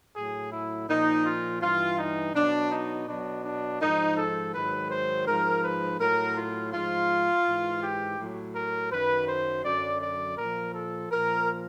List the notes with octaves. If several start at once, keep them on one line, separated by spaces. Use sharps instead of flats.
A2 F#3 G#4
E4
A#2 F3 D#4
F4
G2 E3 F4
D#4
B2 F#3 D4
D#4
B2 F#3 D4
D4
G#2 F3 D#4
A4
G#2 D#3 F#3 B4
C5
G#2 F3 A#4
B4
A2 F#3 A#4
F4
G#2 F3 F4
G#2 E3
G4
A2 F#3
A#4
F#2 D#3 F#3 B4
C5
F#2 D3 F#3 D5
D5
A#2 F3 A#4
A4
A#2 F3 A#4